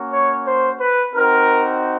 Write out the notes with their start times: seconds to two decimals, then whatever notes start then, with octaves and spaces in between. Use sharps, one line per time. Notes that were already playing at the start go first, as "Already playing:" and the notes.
Already playing: A#3 C#4 F#4
0.11 C#5
0.45 C5
0.79 B4
1.14 C4 D#4 F#4 A#4